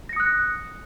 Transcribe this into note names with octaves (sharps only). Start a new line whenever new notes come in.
D#6 F#6 A#6 C#7